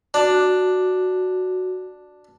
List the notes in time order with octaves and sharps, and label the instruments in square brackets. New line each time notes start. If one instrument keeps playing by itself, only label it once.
[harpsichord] D4 [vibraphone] F#4